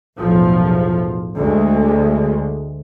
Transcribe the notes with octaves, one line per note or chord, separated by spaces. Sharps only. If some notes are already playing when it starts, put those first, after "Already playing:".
B1 E2 A2 F3
D2 G#3